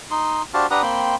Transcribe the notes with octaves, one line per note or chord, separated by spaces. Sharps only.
D#4 C6
D4 F#4 G4 C5 F5 A5
D4 G4 B4 F#5 A#5 D#6
A#3 C4 G5 B5 C6